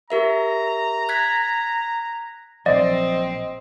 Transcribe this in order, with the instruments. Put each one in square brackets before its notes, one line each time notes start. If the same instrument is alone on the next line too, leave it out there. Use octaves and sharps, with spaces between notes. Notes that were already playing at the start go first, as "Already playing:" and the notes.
[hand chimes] G4 A#4 E5 [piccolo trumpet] A#5
[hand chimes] F#6 G#6 B6
[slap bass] A#1 F3 F#3 [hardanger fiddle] C4 [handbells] D5 [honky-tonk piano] D#5